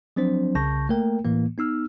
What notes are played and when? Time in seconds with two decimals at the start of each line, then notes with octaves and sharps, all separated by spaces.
0.16 F3 F#3 C4 D4 C5
0.55 C2 C#3 A5 C#6 G6 A#6
0.89 A3 A#3 A#4 G5
1.24 A2 E3 A#3
1.58 B3 D#4 E6 F6